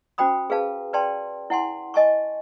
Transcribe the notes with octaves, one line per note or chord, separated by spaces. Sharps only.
C#4 F#4 C5 G5 B5 D#6
G#4 B4 F5 A5
B4 D5 G5 A5 C6
E4 F#5 G#5 C6
D#5 G#5 A5 C#6